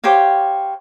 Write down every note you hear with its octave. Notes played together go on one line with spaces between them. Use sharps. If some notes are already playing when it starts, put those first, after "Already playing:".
G4 C5 C#5 F5